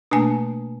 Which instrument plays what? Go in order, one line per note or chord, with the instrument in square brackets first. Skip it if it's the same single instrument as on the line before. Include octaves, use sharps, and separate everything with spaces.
[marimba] B2 A3 A#3 [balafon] D4 G#5